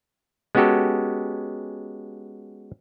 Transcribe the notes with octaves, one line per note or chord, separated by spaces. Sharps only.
G#3 B3 C#4 F#4 G4 A4